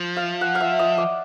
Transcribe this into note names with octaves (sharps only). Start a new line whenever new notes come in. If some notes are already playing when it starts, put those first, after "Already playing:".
Already playing: F3
F5
F#5
F5
E5
D#5
D5